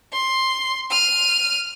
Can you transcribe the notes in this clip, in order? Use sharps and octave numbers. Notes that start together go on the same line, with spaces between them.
C6
F6 D#7